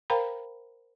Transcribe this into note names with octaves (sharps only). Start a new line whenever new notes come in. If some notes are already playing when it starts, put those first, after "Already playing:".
A#4 C5 F5 G5 A#5 B5